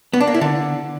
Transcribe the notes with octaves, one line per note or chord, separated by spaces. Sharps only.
B3
D4
A#3
E4
D3